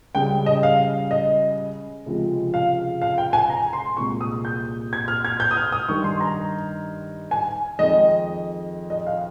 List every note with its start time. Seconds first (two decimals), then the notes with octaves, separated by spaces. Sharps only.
0.15 C#2 C#3 G3 G5
0.46 D#5
0.63 F5
1.11 D#5
2.06 C#2 C3 F3 G#3
2.54 F5
3.02 F5
3.18 G5
3.33 G#5
3.50 A#5
3.73 C6
3.97 C2 A#2 G#3 C#6
4.21 D#6
4.45 G6
4.93 G#6
5.08 F6
5.25 G#6
5.40 G6
5.51 D#6
5.57 F6
5.72 D#6
5.88 G2 D#3 G3 C#6
6.04 C6
6.21 A#5
7.31 G#5
7.79 F2 D#3 G#3 D#5
8.90 D#5
9.07 F5